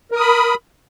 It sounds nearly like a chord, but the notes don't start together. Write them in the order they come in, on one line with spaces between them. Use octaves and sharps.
A#4 D#6 B5